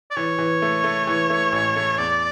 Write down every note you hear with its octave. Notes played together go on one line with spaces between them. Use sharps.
D5
E3 C#5
E3
A3
A3
E3
A3
A1
A3
E2 D5